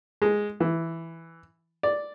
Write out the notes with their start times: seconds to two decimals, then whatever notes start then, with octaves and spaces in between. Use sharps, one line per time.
0.22 G#3
0.60 E3
1.83 D5